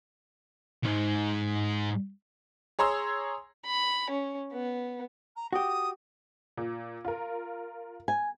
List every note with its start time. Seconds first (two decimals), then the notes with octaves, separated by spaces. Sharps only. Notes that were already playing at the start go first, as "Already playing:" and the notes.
0.84 B1 G#2
2.79 G#4 C#5 A#5 C6 E6
3.66 B5
4.10 C#4
4.53 B3
5.36 A#5
5.53 F#4 G4 D#6
6.57 A#2
7.05 F4 A#4
8.08 G#5